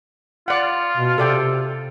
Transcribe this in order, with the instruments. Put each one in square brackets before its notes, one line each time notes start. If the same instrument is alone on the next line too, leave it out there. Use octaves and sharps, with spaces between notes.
[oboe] F4 [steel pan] D5 F#5
[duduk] B2
[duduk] C3 [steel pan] A4 D5 G5